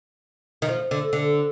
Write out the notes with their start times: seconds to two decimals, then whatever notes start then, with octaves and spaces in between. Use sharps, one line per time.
0.62 D#3
0.69 F3
0.91 D3
1.13 D3